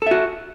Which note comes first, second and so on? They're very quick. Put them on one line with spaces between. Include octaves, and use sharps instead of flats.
A4 E5 F#4